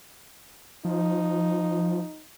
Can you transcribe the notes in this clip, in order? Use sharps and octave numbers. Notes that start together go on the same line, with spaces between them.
F3 D#4